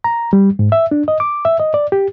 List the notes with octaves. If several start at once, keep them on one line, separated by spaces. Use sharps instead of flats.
A#5
G3
G#2
E5
D4
D#5
D6
E5
D#5
D5
G4